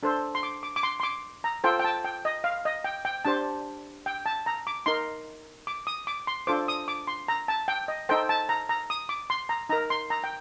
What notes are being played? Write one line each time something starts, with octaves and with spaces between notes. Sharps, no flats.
D4 A4 C5
C6
D6
D6
D6
C6
C6
D6
A#5
F4 A4 C5 G5
G5
A5
G5
D#5
F5
D#5
G5
G5
D4 G4 C5 A5
G5
A5
A#5
D6
D#4 A#4 C6
D6
D#6
D6
C6
D4 F4 A4 C5 D6
D#6
D6
C6
A#5
A5
G5
D#5
D#4 A4 C5 G5
A5
A#5
A#5
D#6
D6
C6
A#5
D#4 A#4 A#5
C6
A#5
G5